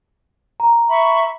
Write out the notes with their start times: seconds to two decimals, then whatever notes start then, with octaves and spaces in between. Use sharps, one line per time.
0.60 A#5
0.89 E5 B5 C#6